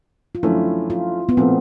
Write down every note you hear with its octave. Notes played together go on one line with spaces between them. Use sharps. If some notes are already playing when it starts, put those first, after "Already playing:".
F4
F#2 D3 F3 A3 C#4 E4
F4
B3
A#2 F3 A3 C4